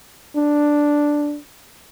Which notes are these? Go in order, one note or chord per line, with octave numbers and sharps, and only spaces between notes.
D4